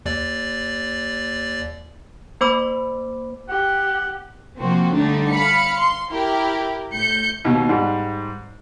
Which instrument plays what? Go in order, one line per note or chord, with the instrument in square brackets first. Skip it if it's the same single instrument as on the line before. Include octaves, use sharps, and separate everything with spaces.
[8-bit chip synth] D#2 D5
[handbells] A#3 C5 B5 D6
[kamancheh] G4 [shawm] F#5
[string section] C3 F3 A#3 C4 F#4
D3 G3 A3 D4 D#4
F5 B5 C#7
C6
E4 G4 A#4
A2 G6 C#7
[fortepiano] D#2 B2
G#2 G3